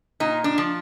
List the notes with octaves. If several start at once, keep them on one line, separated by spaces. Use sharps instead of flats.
A#2 D#4
D4
F3